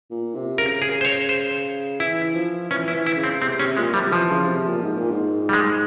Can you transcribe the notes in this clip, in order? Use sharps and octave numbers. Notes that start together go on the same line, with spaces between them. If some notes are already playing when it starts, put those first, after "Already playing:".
A#2
C3
C#3 A#4
G#4
C5
C#5
C5
E3 E4
F3
E3 C#4
E4
E3
E4
C#3
C4
C3 C4
C3 C#4
A#2 G#3
C3 G3
E3 F3
C#3
C3
A#2
G#2
A#2
G#2
G3
G#3